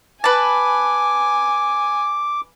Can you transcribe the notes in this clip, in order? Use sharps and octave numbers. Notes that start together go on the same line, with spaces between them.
B4 G#5 A5 D6